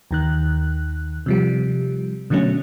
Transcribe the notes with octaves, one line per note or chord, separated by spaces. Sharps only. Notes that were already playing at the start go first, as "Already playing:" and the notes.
D#2 D#3 F#6
C3 F3 G3
B2 D3 F#3 A3 C#4